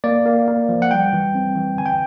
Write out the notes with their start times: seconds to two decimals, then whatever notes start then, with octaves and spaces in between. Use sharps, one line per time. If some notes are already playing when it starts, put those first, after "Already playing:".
0.04 A#3 D5
0.26 A#3
0.48 A#3
0.69 F3
0.82 F#5
0.91 G3 G5
1.13 E3
1.35 C4
1.56 E3
1.77 D3 G#5
1.86 G5